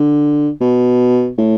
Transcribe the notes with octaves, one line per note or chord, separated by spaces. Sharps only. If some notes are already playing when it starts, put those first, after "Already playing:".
Already playing: D3
B2
A2